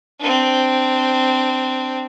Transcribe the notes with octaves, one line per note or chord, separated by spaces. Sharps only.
C4 D4